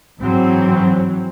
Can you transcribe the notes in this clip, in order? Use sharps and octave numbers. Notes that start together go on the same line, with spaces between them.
G#2 E3 F#3 C4